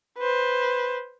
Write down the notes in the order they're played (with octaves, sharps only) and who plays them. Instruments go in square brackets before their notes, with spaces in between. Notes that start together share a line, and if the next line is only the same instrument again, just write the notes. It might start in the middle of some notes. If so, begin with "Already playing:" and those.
[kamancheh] B4 C5